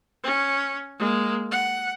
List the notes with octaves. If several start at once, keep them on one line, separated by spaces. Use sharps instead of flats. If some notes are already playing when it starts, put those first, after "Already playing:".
C#4
G#3 A#3
F#5